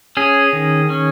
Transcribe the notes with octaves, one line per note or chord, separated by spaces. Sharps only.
C#4 G#4
D#3
C#4